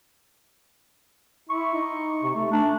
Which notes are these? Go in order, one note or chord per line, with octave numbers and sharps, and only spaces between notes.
E4 C#6
D#4
C3
A3
A3 D4